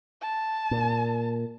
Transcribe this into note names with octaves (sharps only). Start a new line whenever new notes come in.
A5
A#2